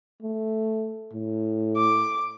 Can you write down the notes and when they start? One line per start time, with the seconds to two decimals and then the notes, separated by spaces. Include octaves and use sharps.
0.22 A3
1.13 A2
1.77 D6